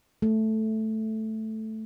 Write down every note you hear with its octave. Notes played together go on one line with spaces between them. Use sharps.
A3